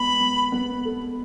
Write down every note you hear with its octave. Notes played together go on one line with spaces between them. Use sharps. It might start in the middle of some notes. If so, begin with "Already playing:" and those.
Already playing: G#3 B3 B5
B3
B3
A4